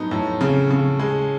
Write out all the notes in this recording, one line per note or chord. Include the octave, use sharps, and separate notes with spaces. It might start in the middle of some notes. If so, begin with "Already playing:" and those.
Already playing: A2 F#3 B3 D#4
A2
C#3
C#3
G#3